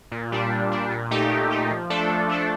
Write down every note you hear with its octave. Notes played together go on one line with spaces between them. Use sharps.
A#2
G3 D4
A#2
G3 D4
A#2
A3 D#4 G4
A#2
A3 D#4 G4
F3
A3 D4 A4
F3
A3 D4 A4